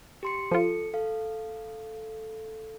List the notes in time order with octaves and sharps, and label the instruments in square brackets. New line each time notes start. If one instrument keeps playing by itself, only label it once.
[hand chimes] G4 C6 C#7
[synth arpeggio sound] F3 F4 [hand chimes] A4 C#7
[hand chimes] A4 F5